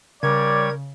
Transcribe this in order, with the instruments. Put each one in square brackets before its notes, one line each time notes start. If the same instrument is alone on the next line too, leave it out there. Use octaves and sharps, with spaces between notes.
[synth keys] C#3 [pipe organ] G3 C#5 G#6 [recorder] A#4 [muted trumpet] D5